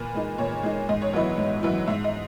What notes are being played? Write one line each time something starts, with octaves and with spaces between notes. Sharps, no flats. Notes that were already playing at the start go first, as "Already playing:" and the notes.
Already playing: A#2 B4
G#3 D#4
A#2 C#5
G#3 D#4
G#2 D#5
C#5
F#3 B3 E4 D#5
G#2
F#3 B3 E4
G#2 E5
D#5